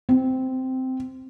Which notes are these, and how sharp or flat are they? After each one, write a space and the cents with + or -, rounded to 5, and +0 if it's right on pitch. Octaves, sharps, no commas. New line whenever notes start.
C4 -10